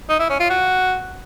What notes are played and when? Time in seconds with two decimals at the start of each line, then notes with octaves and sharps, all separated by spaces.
0.09 D#4
0.19 E4
0.29 C#4
0.40 F4
0.50 F#4